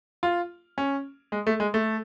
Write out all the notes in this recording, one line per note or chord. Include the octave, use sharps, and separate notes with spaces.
F4
C#4
G#3
A3
G#3
A3